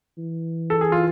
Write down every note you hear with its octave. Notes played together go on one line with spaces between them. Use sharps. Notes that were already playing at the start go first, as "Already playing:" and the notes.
E3
A4
G#4
F4